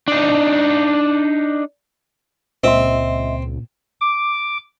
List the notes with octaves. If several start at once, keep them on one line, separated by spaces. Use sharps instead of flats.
D4 D#4
C#2 A#2 C4 D#5 E5 C6
D6